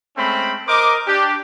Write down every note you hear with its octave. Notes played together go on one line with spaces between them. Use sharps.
G#3 A3 C4 C#4 B5
A#4 C5 D#5 D6
D4 G4